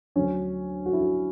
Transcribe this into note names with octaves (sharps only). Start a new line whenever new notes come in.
D2 D3 F#3 C#4
F#4
E4
F#4